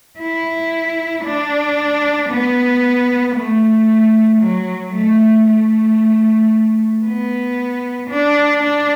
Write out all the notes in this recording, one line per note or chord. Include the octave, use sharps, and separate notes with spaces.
E4
D4
B3
A3
F#3
A3
A3
B3
D4
D4